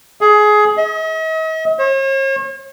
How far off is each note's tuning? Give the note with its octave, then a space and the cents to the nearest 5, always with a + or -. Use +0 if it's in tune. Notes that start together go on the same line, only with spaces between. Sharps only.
G#4 +20
D#5 +45
C#5 -45